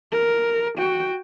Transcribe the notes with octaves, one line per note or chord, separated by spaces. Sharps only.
A#4
F#4 G5